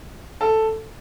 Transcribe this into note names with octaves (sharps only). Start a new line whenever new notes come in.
A4